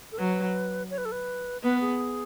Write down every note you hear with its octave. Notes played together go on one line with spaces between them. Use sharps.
A4
F#3 B4
C#5
B4
A4
B4
B3 B4
G#4